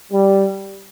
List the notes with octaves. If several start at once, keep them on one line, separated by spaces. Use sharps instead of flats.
G3